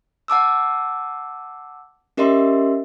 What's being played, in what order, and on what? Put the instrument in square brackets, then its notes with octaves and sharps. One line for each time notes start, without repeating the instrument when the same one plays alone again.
[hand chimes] F#5 A5 D6 E6
C#4 G4 A#4 D#5 E5 C6